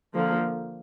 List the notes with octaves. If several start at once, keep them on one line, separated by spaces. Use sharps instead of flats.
D3 F3 A#3